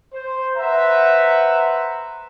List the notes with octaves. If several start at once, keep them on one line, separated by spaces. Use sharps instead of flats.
C5
B4 C5 E5 F#5 A#5